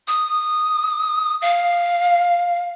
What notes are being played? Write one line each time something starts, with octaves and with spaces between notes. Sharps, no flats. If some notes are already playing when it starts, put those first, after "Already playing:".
D#6
F5